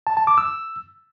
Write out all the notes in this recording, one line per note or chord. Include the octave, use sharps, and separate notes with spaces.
A5
A5
D6
E6